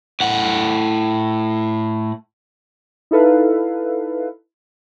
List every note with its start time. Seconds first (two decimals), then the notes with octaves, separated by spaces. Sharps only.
0.20 A2 F#5
3.11 D#4 E4 A4 B4 F5